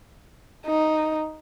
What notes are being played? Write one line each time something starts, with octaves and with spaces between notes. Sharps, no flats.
D#4